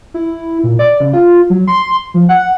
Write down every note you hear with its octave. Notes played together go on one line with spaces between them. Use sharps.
E4
A#2
D5
C#3
F4
F#3
C6
F3
F#5